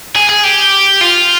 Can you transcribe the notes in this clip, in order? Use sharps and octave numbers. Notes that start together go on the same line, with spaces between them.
G#4
G#4
G4
F4